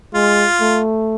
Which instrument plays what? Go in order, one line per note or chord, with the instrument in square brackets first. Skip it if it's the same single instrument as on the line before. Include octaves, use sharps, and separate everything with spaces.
[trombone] G#3 [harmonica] F4
[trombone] A3